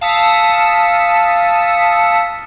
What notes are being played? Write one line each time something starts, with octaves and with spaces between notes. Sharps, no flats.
F5 A5 D#6 E6 B6 C#7